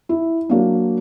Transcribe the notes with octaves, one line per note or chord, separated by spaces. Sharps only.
E4
F#3 A#3 D4